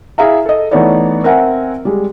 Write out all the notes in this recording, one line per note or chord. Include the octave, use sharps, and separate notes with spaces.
E4 G#4 E5 F5 A#5
A4 D#5
E3 A3 B3 D#4 C#5 D5
C4 A#4 E5 F#5 G#5
G3 G#3